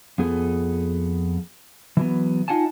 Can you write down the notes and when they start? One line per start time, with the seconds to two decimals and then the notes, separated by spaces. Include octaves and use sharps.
0.18 F2 B3 G#4 A4
1.97 E3 F#3 B3
2.48 D#4 F4 F#5 G#5 A5